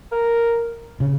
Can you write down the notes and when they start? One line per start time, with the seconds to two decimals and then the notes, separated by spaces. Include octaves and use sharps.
0.12 A#4
1.00 C#3